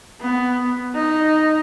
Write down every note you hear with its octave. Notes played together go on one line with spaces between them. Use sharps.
B3
D#4